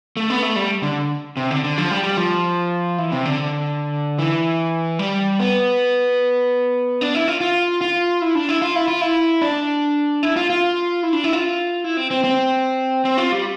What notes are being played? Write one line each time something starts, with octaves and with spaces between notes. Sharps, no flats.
A3
B3
A3
G3
D3
C3
D3
D3
F3
G3
G3
F3
E3
C3
D3
E3
G3
B3
D4
E4
F4
F4
F4
E4
D4
E4
F4
E4
F4
E4
D4
E4
F4
F4
E4
D4
E4
F4
E4
C4
C4
C4
C4
F4
G3